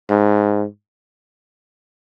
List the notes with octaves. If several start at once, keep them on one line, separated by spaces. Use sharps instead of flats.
G#2